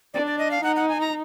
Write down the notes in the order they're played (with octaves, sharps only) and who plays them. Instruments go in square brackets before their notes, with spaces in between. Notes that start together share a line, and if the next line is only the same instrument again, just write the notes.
[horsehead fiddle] D4 [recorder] D5
[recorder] D5
D#5
F5
[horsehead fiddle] D#4 [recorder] F#5
[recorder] F#5
G#5
A#5